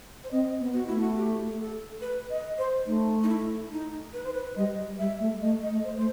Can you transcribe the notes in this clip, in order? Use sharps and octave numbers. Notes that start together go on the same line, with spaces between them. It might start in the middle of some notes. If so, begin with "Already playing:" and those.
C5
C4 D#5
B3
F#4
A3 E4
F#4
G4
A4
B4
D#5
C5
A3 D#4
D#4
E4
D#4
B4
C5
B4
G3 D#5
G3 E5
A3
A3 D#5
D#5
A3
C5
A3 C5